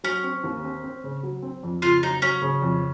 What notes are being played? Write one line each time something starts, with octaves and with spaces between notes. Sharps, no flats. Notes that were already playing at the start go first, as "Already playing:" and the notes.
F#3 C#4
C4
D#2
C4
C4
C#3
F#3
C4
F2
C#3 F4
F#3 D#4
F#3 C#4
C#3
F2